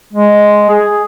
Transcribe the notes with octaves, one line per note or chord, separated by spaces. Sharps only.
G#3
G#4